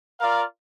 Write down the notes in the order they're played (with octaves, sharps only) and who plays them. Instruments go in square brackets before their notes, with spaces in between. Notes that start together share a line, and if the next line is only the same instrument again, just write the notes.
[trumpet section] F4 A#4 D5 F5